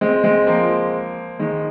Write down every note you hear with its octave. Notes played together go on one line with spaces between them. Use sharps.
G#3 C4
G#3 C4
F3 A#3
D#3 G#3